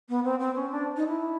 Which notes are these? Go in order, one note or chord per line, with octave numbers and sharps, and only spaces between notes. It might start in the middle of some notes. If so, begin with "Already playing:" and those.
B3
C4
C4
C#4
D4
D#4
E4